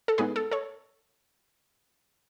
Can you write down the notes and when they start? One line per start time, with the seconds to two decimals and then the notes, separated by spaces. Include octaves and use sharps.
0.08 A4
0.18 A2 G#3 B3 D#4 G#4 B4
0.36 A4
0.51 A4 C#5